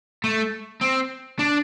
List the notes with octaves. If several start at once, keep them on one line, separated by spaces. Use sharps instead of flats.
A3
C4
D4